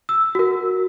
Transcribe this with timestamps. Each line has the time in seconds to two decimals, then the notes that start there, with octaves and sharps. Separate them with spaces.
0.09 E6
0.35 F#4 A#4